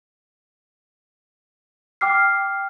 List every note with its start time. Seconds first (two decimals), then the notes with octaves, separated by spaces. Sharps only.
2.01 G5 D6 F6 C7